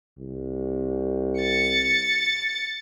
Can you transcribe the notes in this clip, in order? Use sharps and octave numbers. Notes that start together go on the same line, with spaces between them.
C2
A6 C#7